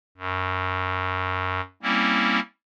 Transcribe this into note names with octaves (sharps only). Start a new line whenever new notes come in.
F#2
G3 A#3 C4 C#4 E4